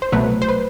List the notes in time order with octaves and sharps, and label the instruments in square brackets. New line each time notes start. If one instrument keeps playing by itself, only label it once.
[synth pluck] C5
C2 B2 F#3 A3 B4
C5
B4